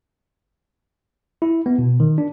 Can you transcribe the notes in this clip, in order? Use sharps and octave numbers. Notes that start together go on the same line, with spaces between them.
E4
B3
B2
D#3
D4